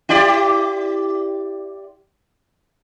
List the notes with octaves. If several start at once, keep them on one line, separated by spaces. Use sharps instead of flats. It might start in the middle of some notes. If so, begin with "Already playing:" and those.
E4 G4 D5